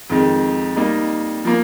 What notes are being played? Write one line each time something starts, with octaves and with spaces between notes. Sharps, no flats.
F2 D#3 G#3
G3 A#3 D#4
F3 A#3